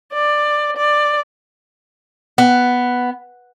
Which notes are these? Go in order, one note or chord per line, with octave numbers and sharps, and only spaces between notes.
D5
D5
B3